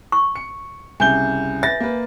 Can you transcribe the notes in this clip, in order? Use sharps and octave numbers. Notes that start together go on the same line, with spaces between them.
C#6
C#7
C2 C#3 G#5 G6 G7
B4 E5 A6
A#3 B4